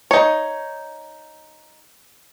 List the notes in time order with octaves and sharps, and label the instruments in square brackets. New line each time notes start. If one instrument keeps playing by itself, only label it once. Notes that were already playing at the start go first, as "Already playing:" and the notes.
[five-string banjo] D#4 C#5